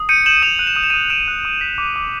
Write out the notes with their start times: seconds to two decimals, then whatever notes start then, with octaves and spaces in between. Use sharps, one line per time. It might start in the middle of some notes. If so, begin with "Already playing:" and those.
Already playing: D#6
0.09 G6 C#7 D#7
0.26 G6 E7 F#7
0.42 D#6 D#7 F7
0.59 F#6 D#7
0.67 E7
0.76 D#6 D#7
0.84 E7
0.90 D#6 C#7 D#7
1.10 F#6 D7 E7
1.28 F#6
1.45 D#6
1.61 G6 B6
1.78 D6
1.96 D6